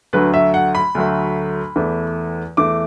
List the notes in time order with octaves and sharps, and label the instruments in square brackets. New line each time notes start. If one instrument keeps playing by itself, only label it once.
[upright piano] D2 D3 F#3 A3 B4
E5
F#5
B5
D2 D3 F#3 A3
E2 E3 A3
E2 E3 A3 D6